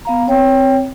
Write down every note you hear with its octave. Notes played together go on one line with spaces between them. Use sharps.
B3 F5 A#5
C4 C#5 G5